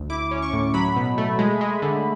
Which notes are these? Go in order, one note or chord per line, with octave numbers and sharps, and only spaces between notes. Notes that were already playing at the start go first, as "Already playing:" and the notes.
Already playing: D2
E4 D6
C#4
C#6
A2
F#3 B5
B2
A3
G#3
G#3
D3